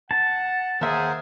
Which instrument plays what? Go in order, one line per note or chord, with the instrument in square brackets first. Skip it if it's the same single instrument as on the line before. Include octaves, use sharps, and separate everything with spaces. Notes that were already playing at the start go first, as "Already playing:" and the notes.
[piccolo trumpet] F#5 [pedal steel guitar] A5
[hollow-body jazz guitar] D#2 E5 [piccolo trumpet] G#4 [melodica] A#4 C5 F#5